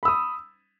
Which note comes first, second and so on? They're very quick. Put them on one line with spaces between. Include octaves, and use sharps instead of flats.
B5 E6 D#6